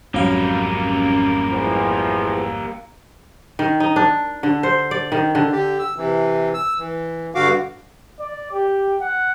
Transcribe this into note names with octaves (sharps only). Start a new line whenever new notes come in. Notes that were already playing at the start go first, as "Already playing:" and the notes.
G#1 F2 F#3 G3 A#3 C#4 F5
E2 F3
D#3
D#4
D4
D3
C5
D5
D#3
D3
D3 G4
E6
C3 E3
E6
E3
G2 D3 F#4 F5 D6
D5
G4
F#5